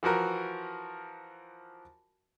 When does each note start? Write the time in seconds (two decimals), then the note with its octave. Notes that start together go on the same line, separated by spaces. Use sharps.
0.03 E3 F3 F#4 A#4